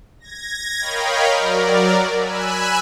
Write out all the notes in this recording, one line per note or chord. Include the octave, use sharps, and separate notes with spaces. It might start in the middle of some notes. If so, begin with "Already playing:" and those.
G#6 A#6
A#4 C#5 D#5 F5 G5 B5
F#3 A#4 D5
G#5 B5 E6 F#6